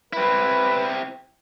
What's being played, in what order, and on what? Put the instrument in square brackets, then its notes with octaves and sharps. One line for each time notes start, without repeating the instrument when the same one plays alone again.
[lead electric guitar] C4 E4 [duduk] B4